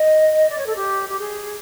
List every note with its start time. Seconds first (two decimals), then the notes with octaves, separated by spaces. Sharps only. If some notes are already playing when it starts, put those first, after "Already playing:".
Already playing: D#5
0.49 D5
0.57 C#5
0.66 A4
0.75 G4
1.08 G4
1.19 G#4